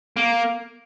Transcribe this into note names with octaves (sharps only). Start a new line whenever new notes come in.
A#3